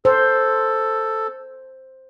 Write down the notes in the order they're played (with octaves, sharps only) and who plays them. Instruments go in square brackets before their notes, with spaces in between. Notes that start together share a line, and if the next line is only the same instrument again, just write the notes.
[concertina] A4 [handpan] C5